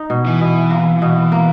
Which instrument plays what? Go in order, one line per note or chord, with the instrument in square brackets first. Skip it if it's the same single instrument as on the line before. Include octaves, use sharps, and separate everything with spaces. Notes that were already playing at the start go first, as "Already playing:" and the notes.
Already playing: [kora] D#4
B2
[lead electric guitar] E3
[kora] B2
A#3
B2
A#3